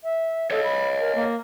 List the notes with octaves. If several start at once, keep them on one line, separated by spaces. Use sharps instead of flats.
E5
A4 C#5 D#5
B5
A#4
A#3